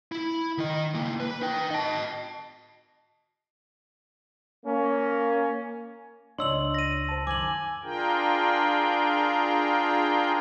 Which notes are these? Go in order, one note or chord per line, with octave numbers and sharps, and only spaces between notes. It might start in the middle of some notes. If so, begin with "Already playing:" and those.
E4
D#3 D#5
A#3 E4
B4
D#4 G5
D#5 A5
A#3 C#4
C#2 D4 C#5 D#5 C6 E6 F#7
A#6 D#7
C5 A5
F#2 D#3 G#5 D6 F#7
D4 F4 G#4 A#4 G5